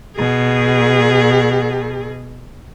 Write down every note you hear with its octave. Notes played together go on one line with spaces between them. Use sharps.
B2 G#4